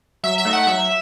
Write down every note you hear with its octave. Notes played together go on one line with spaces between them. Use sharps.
F#3 E5
E5
A3 D#4
F#5
F#3 E5